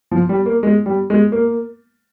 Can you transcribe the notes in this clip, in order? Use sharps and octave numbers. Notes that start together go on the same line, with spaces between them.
F3
G3
A#3
G#3
G3
G#3
A#3